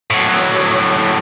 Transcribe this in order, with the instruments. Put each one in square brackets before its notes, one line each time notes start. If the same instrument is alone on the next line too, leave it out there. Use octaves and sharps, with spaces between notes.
[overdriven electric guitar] A2 F#3